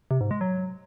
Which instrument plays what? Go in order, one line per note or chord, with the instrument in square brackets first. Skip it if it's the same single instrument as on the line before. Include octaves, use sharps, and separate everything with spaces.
[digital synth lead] C3
G#2
G#3
F#3